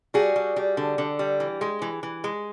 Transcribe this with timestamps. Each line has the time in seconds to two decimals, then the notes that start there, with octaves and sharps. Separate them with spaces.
0.14 G3 F#4 G#4
0.36 G3
0.56 G3
0.77 D3
0.98 D3
1.19 G3
1.40 E3
1.61 G#3
1.82 E3
2.03 E3
2.24 G#3